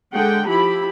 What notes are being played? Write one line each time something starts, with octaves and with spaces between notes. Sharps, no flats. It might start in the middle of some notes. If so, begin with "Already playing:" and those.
D3 G#3 F#5 G5
F3 E4 G4 B5